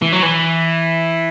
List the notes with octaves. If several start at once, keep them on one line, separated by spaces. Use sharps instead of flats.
E3
F#3
E3